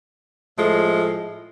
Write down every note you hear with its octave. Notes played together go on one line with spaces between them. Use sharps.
A2 F3 G#3 A3